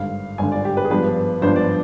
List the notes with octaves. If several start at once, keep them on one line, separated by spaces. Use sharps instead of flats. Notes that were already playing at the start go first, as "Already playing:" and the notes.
Already playing: G#1 G2 D3 F5
G#1 G2 D3 G#5
D5
G4
B4
G#4
G#1 G2 F3 B3 D4 B4
G#1 G2 F3 B3 D4 C5
D5